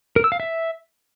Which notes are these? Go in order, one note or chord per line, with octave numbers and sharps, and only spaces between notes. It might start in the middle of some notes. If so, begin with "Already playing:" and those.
A#4
E6
F5
E5